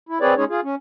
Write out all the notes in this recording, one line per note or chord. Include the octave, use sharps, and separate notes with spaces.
E4
C4 G#4 B4 C#5 D5
G#3 C#4 D#4 G#4 C#5
F4 G#4
C#4